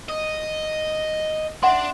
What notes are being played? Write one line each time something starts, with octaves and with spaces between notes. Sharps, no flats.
D#5
D4 E5 F#5 C6